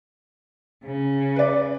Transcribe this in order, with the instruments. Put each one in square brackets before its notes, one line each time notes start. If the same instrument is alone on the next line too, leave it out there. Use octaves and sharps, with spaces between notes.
[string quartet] C#3
[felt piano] B4 D5